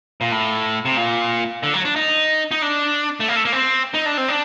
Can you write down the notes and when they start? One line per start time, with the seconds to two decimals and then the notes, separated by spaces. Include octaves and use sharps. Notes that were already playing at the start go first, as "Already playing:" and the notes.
0.21 A#2
0.31 A2
0.85 C3
0.97 A#2
1.63 D3
1.74 F#3
1.85 D4
1.96 D#4
2.51 D#4
2.62 D4
3.20 A3
3.28 A#3
3.36 A3
3.45 A#3
3.53 C4
3.94 D#4
4.06 D4
4.17 C4
4.28 D4